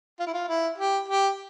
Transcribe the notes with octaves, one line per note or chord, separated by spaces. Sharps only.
F4
E4
F4
E4
G4
G4